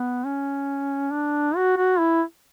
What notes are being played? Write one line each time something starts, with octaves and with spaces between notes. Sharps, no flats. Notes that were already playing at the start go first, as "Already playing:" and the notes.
Already playing: B3
C#4
D4
F#4
F#4
E4